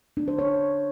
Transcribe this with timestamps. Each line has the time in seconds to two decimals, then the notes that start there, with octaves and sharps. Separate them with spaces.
0.17 D4
0.28 C5
0.39 C#5